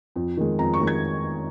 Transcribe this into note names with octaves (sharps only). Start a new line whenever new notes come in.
F2
D#3 G#3
F2 A#5
C#6
D#3 G#3
G#6